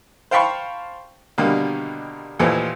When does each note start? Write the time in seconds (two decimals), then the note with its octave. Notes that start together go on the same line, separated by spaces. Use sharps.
0.31 C5 F5 G5 A5 B5 C#6
1.38 B2 D3 D#3 G3 A#3
2.39 D#2 A#2 E3 F3 A3